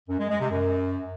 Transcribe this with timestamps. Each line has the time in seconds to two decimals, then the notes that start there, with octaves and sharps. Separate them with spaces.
0.08 F#2
0.19 G#3
0.29 G#3
0.39 C3
0.50 F#2